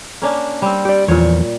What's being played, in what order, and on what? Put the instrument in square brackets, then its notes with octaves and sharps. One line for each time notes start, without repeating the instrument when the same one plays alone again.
[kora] A#3 C#4 D4
G3 C4
[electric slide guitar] G4 D5
[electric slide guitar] E2 F3 [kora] A#2 C#5